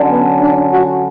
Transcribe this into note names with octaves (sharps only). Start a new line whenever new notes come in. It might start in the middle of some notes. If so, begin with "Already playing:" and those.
Already playing: D3 F#3 C#4
B3
D4
F#4